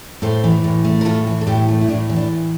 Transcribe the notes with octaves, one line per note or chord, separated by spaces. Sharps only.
A2 A4 C5
E3
A2
A3
A#4
A2 F4 A4
E3
A4
A2 E4 G4
A3
E4
A2 D4
E3
D4
A2